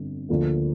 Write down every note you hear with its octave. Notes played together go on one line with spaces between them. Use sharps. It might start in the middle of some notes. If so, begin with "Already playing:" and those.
Already playing: G1 F2 D3
D2 D3 F3 A#3